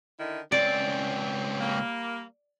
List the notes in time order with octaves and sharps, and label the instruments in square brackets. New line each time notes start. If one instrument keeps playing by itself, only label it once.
[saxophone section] D3 D#3 E4
[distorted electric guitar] C#2 C4 [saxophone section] C#4 [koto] D5
[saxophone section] G3 A#3